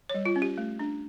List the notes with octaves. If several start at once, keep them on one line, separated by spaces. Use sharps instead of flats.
C#5
G3
F4
C#4
G4
A3
D4